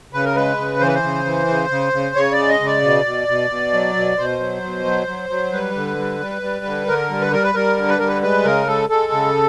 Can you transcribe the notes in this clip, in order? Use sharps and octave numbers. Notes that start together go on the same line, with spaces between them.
C#3 B4
A#4
G#3 B4
C#3
E3 C5
B4
C5
C#3
E3
C#3
C#3
C#3
C#3 C#5
D5
G#3
D#5
C#3
D5
B2
B2
B2
B2
F#3
B2
B2 C5
F#3
B2
F#3
F#3
F#3
G3 B4
D3
G3
G3
G3
D3
D3 A#4
G3
B4
G3 A#4
B4
G3 A#4
D3
B4
G3 A#4
B4
G#3 B4
C#3 A#4
G#3 A4
G#3 A4
C#3